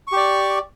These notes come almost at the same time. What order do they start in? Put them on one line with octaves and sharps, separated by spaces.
C#6 G4 D5